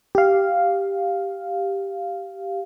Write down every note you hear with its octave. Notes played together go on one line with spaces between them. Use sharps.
G4 F5